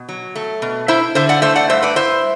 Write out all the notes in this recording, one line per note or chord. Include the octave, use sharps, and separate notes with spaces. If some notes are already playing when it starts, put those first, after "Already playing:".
Already playing: B2
F#3
A3
B2
E4 C5 E5
D3 C5 E5
D5 F#5
A3 C5 E5
D5 F#5
G2 C5 E5
B4 D5
E4 C5 E5